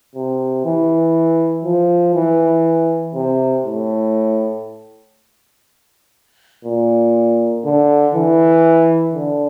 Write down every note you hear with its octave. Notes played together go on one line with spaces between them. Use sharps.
C3
E3
F3
E3
C3
A2
A#2
D3
E3
D3